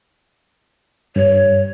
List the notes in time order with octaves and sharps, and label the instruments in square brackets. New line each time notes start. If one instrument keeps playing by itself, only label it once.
[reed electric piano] G2 [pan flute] C#5